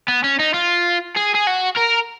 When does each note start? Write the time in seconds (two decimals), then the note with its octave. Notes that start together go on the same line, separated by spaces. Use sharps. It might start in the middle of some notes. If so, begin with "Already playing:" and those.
0.08 B3
0.24 C#4
0.39 D#4
0.54 F4
1.16 G#4
1.34 G#4
1.47 F#4
1.77 A#4